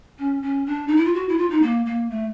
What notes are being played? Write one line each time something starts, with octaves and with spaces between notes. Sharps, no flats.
C#4
C#4
D4
D#4
E4
F4
F#4
E4
F4
D#4
A#3
A#3
A3